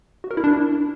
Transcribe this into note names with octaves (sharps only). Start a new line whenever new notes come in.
F#4
A#4
E4
D4